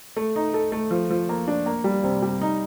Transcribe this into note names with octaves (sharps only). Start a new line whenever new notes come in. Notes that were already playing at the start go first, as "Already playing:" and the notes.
A3
D#4
A4
A3
F3
F3
A#3
D4
A#3
G3
C3
G3
D#4